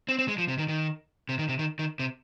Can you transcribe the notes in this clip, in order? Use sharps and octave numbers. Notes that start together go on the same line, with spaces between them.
C4
C4
G#3
F3
C3
D#3
D#3
C3
D#3
C3
D#3
D#3
C3